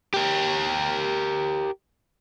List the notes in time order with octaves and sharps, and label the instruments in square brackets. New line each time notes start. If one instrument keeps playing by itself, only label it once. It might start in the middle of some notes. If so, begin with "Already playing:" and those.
[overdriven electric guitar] G4 A#4